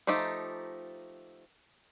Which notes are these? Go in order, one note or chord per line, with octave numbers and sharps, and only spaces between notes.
F3 A3 D#4 G4 A4